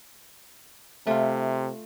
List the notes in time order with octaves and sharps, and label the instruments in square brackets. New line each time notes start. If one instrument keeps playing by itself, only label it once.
[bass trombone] C3 [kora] A3 F4